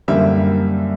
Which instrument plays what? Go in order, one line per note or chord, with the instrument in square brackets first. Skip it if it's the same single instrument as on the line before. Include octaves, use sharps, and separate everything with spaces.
[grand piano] F#2 D3 G3 A#3 E5